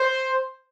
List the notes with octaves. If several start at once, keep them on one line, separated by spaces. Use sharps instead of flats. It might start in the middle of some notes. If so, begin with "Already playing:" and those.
Already playing: C5